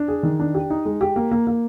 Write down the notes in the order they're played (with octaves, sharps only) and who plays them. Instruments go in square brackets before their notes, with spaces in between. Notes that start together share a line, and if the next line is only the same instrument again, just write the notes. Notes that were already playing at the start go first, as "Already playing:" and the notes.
Already playing: [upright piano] D4
G#4
D#3
D4
G4
D#4
G#3
G4
A#3
A#3
A#3